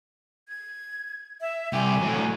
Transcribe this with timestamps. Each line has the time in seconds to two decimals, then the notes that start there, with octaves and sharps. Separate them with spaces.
0.49 G#6
1.41 E5
1.73 C2 G4 G#5
2.02 A2 F#3